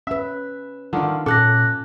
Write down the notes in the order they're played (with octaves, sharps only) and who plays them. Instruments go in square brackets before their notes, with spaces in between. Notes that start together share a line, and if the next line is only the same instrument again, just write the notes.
[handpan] C#4 B4 [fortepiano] E5
[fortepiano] D3 D#3 [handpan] F4 F5
[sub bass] A#2 [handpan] C#4 [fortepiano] A4 [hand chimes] D6 F#6 A#6